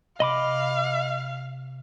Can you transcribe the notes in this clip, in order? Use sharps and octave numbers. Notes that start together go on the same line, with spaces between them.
C3 D#5 F5 B5 D6